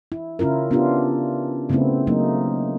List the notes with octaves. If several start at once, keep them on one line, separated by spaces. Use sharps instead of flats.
E4
C#3 C#4 E4 F4 A#4
B3 C#4 D4 F4 G4
C#3 A3 B3 C4 E4
F#3 A3 A#3 D#4